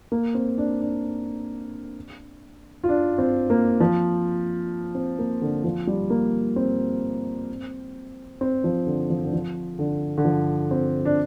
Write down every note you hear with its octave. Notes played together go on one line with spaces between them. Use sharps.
A#3
C4
D4
D4
F4
D4
C4
A#3
F3
C4
A#3
D3
F3
G3
A#3
C4
C4
F3
D3
F3
D3
F3
D3
D3
F3
C4
D4